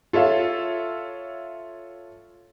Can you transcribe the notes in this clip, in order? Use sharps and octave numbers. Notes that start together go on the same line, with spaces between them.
F4 A4 C#5 E5 F5